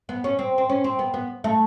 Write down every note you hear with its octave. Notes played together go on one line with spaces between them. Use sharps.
B3
C#4
C4
C4
C#4
C4
B3
B3
A3